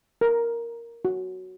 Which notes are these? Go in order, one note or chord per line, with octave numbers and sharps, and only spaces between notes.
A#4
F#4